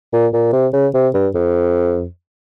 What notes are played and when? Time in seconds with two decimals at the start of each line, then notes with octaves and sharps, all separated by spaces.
0.13 A#2
0.33 A#2
0.53 C3
0.73 C#3
0.94 C3
1.14 G2
1.34 F2